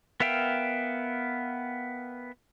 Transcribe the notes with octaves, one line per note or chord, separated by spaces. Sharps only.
B3 A#4 E5 F5 G5